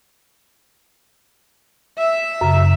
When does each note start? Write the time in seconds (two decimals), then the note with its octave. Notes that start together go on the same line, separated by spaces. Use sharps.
1.98 E5
2.41 F#2 C#3